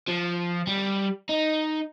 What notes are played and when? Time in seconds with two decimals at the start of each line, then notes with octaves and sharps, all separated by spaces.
0.08 F3
0.67 G3
1.29 D#4